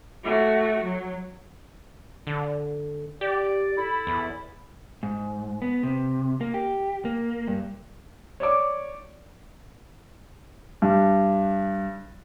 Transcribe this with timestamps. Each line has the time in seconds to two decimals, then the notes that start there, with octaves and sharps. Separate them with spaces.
0.24 A3 F#4
0.84 F#3
2.27 D3
3.21 G4 D5
3.76 E4 A4 B5
4.07 E2
5.03 G#2
5.62 B3
5.83 C3
6.41 A#3
6.54 G4
7.05 A#3
7.48 G2
8.40 C#5 D5 D6
10.82 G2